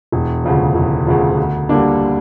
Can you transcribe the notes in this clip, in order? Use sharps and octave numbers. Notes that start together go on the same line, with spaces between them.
E1
D2 C#3 F3
E1
D2 C#3 F3
D2
D3 G3 A#3 D4